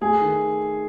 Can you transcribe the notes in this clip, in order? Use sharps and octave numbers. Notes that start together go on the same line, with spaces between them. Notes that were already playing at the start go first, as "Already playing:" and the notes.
A3 G#4
D#3